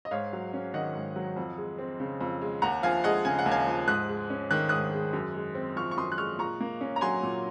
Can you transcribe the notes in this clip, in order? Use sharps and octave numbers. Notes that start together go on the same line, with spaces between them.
D#5
G#2 C#5 F5
F#3
C#4
D#3 D#5 F#5
G#2
F#3
F2
G#3
C4
C#3
F2
G#3
D#2 F#5 A#5
F3 F5 G#5
G#3 D#5 F#5
C#3 G#5
F#5
D#2
F5 G#5
F3
G#2 D#6 F#6
G#3
C#4
D#3 F#6
G#2 D#6 F#6
G#3
F#2
G#3
C4
F3 C#6 F6
C#6
F#2 C6 D#6
F#6
G#3 C#6 F6
A#2 A#5 C#6
A#3
C#4
A#5
F#3 G#5 C6
A#2